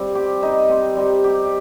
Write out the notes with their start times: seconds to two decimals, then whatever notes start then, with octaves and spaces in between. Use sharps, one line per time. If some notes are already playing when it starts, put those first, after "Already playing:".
Already playing: G3 C4
0.15 G4
0.43 D#4
0.70 C4
0.97 G3
1.24 G4